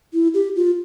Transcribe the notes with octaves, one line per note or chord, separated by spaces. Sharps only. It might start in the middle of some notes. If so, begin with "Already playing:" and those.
E4
G4
F4